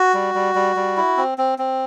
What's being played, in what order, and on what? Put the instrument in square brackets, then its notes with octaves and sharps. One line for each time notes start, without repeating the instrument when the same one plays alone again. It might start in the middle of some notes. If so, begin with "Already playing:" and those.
Already playing: [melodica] F#4
G3
G3
G3
G3
E4
C4
C4
C4